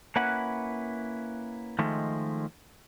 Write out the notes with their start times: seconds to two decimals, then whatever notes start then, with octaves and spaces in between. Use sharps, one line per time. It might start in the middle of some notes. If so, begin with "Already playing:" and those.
0.16 A#3 C#4 E4 B4 F#5
1.79 D#3 F3 G#3 A3